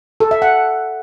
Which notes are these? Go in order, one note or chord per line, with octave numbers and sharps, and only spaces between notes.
A4
E5
F#5